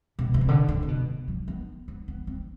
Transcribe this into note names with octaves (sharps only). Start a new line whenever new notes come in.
B2
B2
C3
D3
D3
C3
B2
F#3
B3
B3
B3
C4